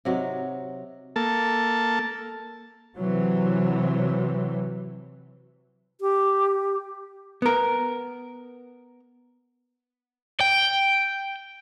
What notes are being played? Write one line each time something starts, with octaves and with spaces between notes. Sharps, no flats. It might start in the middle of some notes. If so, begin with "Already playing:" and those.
C3 F#3 D#4 F#4
A#3 A4 A5
C3 E3 F#3
G4
B3 A#4
G5